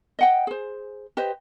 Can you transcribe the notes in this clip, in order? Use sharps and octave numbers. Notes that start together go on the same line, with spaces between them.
D#5 F#5 G5
G#4 C5
G4 B4 C5 D#5